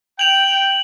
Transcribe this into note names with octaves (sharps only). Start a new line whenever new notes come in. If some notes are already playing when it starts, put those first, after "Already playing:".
G5 F7 F#7